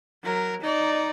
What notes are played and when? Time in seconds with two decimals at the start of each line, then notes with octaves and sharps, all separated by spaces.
0.23 F#3 A#4
0.61 D#4 D5